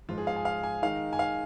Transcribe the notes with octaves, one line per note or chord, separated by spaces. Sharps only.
G#2 F3 G#3 F4
G#4
F5
G#5
F5
G#5
D#3 G#3 D#4 F5
G#5
F5